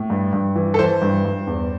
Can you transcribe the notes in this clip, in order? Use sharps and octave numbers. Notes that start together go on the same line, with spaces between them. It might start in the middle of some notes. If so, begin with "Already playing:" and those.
Already playing: A2
G2
G2
E3
A4
E3 C5
G2
G2
E2